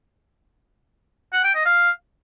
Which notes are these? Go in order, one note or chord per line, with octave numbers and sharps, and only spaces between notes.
F#5
G5
D#5
F5